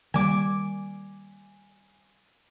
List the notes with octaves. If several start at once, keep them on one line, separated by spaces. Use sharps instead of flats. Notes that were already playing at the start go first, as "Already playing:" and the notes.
D#3 G3 A#3 G#5 D6